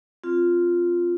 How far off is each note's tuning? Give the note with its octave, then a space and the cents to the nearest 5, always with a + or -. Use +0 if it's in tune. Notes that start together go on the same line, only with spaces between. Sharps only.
C4 +0 F4 +0